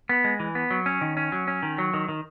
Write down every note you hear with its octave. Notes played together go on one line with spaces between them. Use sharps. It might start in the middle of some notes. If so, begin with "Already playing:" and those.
B3
G#3
E3
B3
F#3
C#4
D#3
C#4
F#3
C#4
D#3
F#3
D#3
D#3